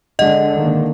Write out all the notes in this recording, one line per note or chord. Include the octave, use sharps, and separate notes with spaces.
D3 G#3 D#5 F#5
D#3 A#3